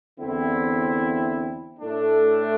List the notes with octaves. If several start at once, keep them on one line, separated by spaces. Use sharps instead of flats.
E2 D3 C4 E4
A2 A3 D4